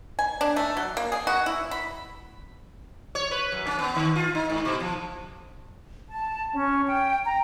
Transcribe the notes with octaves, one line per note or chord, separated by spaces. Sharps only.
G#5
D4
A3
F#3
A#3
G#4
F#4
E4
B5
C#5
B4
F#2
C#4
B3
D#3
F4
D#4
G#2
B2
F3
A5
C#4
G5
A#5